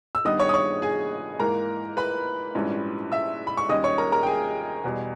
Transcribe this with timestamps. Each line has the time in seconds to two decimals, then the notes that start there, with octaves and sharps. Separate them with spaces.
0.15 E6
0.25 G2 D#3 G3 B3 D#5 D#6
0.40 C#5 C#6
0.49 D#6
0.54 C#5 C#6
0.82 G#4 G#5
1.39 G#2 E3 A#3 A#4 A#5
1.97 B4 B5
2.55 A#1 G#2 E3 G3 C#4
3.12 E5 E6
3.47 B5
3.57 C#6
3.69 D#2 D#3 G3 C#4 D#5 D#6
3.84 C#5 C#6
3.98 A#4 A#5
4.12 A#4 A#5
4.23 G5
4.26 G#4 G#5
4.84 E2 B2 G3